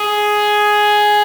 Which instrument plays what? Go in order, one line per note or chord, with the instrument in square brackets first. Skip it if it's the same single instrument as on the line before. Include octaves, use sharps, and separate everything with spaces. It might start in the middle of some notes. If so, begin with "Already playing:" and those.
Already playing: [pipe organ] G#4